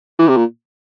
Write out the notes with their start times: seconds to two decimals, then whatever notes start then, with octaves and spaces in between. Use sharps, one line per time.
0.19 E3
0.28 C3
0.37 A#2